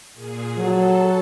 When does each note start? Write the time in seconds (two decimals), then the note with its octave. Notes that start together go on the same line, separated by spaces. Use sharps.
0.13 A#2 G#4
0.58 F#3 A4 A5